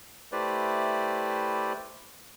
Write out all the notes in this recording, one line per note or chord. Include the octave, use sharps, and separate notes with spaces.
A3 E4 G4 B4 C5 D5